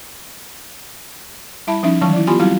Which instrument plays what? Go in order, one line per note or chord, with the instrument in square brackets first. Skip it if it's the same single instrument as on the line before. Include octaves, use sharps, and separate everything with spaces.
[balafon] G3 E4 E5 A5 B5
F3 C#4 D#4 E5
D#3 E3 F#3 G3 A5 C#6
E4 D5
B3 F4 G4 G#5 B5 C6
F#3 G3 C4 E4 F#4 F5